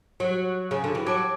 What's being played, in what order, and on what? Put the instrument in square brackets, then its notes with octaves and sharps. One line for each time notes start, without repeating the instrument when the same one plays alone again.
[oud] F#3
C#3
D3
E3
[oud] F#3 [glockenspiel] A5 D6 G#6 D7